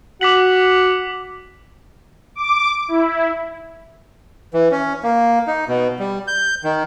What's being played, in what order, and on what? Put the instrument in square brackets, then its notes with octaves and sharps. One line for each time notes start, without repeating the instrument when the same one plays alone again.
[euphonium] F#4 [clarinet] F#5 [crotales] D6 B6 F#7
[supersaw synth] D6
E4
[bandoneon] E3
C#4
A#3
D#4
B2
G3
G6
D#3